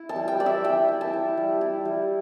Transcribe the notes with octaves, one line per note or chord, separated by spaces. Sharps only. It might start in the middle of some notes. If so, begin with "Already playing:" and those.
Already playing: E4
A5
G3
G5
E4 D5
E5
G3 G5
E4
A5
E4
G3
E4
G3